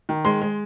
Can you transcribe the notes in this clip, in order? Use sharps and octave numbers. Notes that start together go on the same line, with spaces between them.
D#3
G#3 C6
G#3